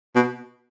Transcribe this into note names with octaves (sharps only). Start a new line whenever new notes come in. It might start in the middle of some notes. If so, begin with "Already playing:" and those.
B2